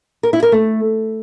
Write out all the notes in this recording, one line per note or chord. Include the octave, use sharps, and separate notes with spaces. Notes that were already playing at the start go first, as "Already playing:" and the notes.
A#4
E4
A#4
A3